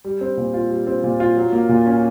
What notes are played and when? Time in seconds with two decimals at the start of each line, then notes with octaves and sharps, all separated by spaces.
0.05 G3
0.21 C4
0.37 A#2
0.54 F4
0.71 G3
0.87 C4
1.04 A#2
1.20 F4
1.37 F#3
1.53 A#3
1.69 A#2
1.86 C#4